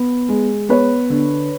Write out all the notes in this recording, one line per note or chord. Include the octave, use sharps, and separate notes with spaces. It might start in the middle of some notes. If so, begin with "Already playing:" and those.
Already playing: B3
G#3
B3 B4 C#5
D3